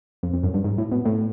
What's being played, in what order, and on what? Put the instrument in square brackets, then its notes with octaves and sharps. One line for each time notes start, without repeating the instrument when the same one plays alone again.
[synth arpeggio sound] F2
F2
F#2
G2
G#2
A2
B2
A2